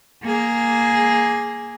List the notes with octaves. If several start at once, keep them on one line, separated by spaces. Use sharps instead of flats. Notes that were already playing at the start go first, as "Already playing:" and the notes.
A#3 G#4